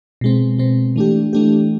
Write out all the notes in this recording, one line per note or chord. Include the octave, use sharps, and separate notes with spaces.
B2 G#3 C4
B2 G#3 C4
E3 A3 D4 G4
E3 A3 D4 G4